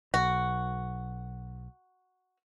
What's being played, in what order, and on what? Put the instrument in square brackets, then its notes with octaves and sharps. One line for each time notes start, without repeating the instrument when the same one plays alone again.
[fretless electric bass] B1 [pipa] F#4